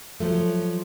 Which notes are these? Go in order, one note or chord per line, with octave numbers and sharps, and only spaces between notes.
F3 F#3 A3